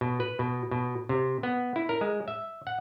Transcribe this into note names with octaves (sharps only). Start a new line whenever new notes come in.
B2
B4
B2
B2
C3
B3
E4
A#4
G#3
E5
F#5